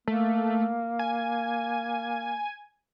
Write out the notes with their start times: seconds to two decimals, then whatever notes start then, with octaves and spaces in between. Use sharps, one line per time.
0.08 A3 A#3
0.99 G#5